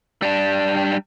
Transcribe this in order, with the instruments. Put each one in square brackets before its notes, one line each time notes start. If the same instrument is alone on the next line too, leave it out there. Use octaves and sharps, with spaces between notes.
[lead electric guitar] G3 D4